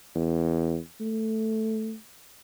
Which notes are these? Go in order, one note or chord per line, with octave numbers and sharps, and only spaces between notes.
E2
A3